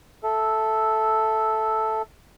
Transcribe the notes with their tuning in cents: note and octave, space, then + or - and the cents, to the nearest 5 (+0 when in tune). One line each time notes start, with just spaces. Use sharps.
A4 -5 E5 +0